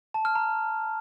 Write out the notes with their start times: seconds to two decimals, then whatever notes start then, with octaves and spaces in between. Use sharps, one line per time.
0.14 A5
0.25 F6
0.35 A#5